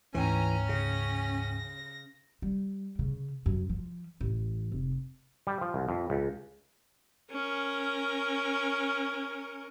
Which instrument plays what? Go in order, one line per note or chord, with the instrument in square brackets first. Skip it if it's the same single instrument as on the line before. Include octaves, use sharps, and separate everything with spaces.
[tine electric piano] D2 G#2 G5 [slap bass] E3 [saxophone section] C#4 [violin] G#5 A#5
[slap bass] C#3 [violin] A#6
[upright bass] G3
C#3
F#2
F3
A1
F1
[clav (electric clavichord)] G3
F3
C2
F2
C#2
[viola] C#4 A#4